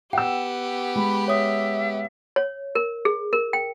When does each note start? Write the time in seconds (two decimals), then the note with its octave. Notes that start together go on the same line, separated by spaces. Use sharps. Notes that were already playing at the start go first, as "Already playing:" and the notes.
0.13 B3 G4 F#5 G5 E6
0.96 G#3 B5
1.28 C#5 E5 D#6
2.36 C#5
2.75 A#4
3.05 G#4
3.33 A#4
3.53 G5